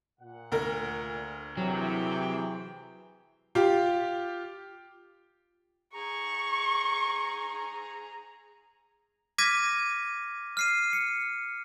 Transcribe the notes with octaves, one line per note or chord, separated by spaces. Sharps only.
A#2 F#5
D2 A#4
C3 E3 F#3 E4 G#4 G5
F4 G4
G#4 A#5 C#6
D6 F6 G#6 A#6 B6 D#7
F6 C7 D#7
C#7